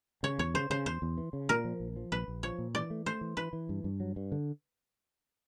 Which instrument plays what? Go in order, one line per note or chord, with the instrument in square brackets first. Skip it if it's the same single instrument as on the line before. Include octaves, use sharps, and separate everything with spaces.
[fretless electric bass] C#3 [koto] C#5
[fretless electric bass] E2 [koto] C#5
[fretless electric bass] C#3 [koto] C5
[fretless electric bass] C#3 [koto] C5
[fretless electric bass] E2 [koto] C5
[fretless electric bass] E2
E3
C#3
[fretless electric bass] A#2 [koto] A#4
[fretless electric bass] F3
A#1
F3
[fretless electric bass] A#1 [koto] B4
[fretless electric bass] A#1
[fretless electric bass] F3 [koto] C#5
[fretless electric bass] A#2
[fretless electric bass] E3 [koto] D5
[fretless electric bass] A3
[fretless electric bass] A3 [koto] C5
[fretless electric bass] E3
[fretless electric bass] E3 [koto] B4
[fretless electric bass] E3
G2
G2
F#3
G2
D3